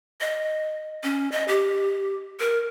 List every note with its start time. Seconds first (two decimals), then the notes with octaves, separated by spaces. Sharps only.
0.21 D#5
1.03 C#4
1.32 D#5
1.48 G4
2.40 A#4